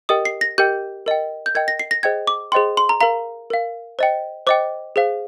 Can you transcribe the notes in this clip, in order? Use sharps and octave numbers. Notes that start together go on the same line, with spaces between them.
G4 A#4 D#5 G5 D#6
C7
A#6
G4 A#4 D#5 G5 G6
A#4 D#5 G5
G6
A#4 D#5 G5 G#6
A#6
C7
A#6
G#4 C5 D#5 G5 G#6
D6
G#4 C5 D#5 G5 C6
C6
A#5
A#4 F5 A#5
A#4 F5
C5 D#5 G5
C5 D#5 G5 D6
G#4 C5 F5